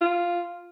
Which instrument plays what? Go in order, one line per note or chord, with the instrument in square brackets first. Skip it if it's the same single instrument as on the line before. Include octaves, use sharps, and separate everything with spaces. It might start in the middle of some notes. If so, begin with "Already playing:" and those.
[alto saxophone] F4